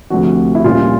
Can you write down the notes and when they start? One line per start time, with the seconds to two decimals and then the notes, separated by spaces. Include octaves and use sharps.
0.10 D2 C3 F3 F#4
0.55 E4
0.64 A#1 A#2 G3 A#3 C#4 F4